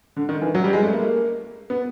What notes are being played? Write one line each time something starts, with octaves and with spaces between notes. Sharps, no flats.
D3
D#3
E3
F#3
G3
G#3
A3
A#3
B3